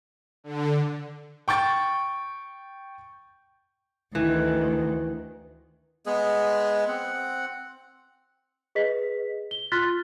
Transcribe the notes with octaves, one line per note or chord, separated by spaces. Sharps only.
D3
G5 C#6 G6 A6
D2 D#3 E3
G#3 B3 G#4
C4 F#5
G#4 B4 D#5 B6
G7
F4 C6 F6 F#6 A6 B6